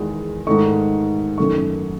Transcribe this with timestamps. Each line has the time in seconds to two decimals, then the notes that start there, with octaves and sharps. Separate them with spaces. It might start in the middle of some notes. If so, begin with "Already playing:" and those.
Already playing: E2 D#3 G#3
0.47 G#2 D#3 A3 D#4 C#6
1.38 F#2 D#3 A3 C#6